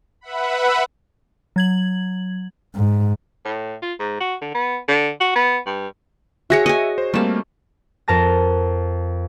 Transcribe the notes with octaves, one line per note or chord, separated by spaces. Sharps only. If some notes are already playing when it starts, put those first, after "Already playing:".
B4 E5 F#5 B5
F#3 G#6 F#7
G#2
A2
F4
G#2
F#4
D3
B3
D3
F#4
B3
G2
F#4 G#4 C#5 E5 A#6 C#7
D#5 G#5
C5
G3 A3 A#3 C4 A5
F2 A#4 A5 A#6